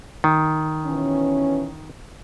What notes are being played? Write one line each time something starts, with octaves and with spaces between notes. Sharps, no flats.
D#3
B2 E3 C#4